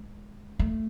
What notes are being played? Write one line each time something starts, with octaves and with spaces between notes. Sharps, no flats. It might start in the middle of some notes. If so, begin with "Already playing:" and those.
Already playing: G#3
A3